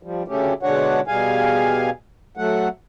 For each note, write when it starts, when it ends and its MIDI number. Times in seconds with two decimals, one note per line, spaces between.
0.03 0.23 53
0.03 0.23 55
0.28 0.53 38
0.28 0.53 49
0.28 0.53 57
0.28 0.53 61
0.28 0.53 67
0.63 1.00 47
0.63 1.00 50
0.63 1.00 56
0.63 1.00 62
0.63 1.00 73
0.63 1.00 78
1.07 1.90 47
1.07 1.90 55
1.07 1.90 68
1.07 1.90 77
1.07 1.90 80
2.37 2.68 54
2.37 2.68 57
2.37 2.68 78